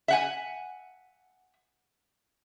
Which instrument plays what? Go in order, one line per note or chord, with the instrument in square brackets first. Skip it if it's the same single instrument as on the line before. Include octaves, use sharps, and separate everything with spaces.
[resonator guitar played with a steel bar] E5 F#5 G#5